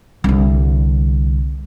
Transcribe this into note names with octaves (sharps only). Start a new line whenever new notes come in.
C2 D3